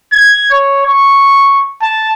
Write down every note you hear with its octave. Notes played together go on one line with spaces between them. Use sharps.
G#6
C#5
C#6
A5